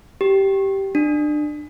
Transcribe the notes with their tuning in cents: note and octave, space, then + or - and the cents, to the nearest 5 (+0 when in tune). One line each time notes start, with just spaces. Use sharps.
G4 -10
D4 +30